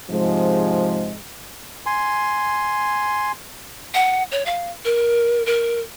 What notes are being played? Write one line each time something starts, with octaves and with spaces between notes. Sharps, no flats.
G#2 C3 F3 G#3
G#5 C6
F#5
C#5
F5
A#4
A#4